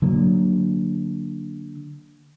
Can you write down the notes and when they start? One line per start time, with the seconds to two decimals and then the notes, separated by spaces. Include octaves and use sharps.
0.02 D3 F#3 A#3